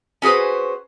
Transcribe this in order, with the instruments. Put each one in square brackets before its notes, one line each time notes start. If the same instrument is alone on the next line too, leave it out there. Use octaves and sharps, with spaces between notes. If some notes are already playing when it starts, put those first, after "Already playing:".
[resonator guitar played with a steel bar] C#4 F#4 G#4 B4 C5